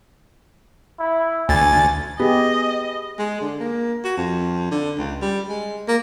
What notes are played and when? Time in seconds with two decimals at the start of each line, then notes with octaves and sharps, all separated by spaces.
0.99 E4
1.49 D2 G#5 A6
2.20 B3 G4 G#4 D#5
3.18 G#3
3.41 D3
3.60 A#3
4.04 F#4
4.17 F2
4.71 D3
4.98 C#2
5.22 G3
5.49 G#3
5.88 A#3